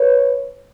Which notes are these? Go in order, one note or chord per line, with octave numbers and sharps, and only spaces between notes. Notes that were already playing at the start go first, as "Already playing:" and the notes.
Already playing: B4 C#5